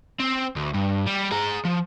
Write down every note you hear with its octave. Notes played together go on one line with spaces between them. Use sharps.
C4
D2
G2
G3
G#4 A#5
F3